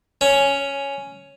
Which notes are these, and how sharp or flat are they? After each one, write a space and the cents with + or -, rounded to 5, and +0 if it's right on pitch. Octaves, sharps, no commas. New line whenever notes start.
C#4 +5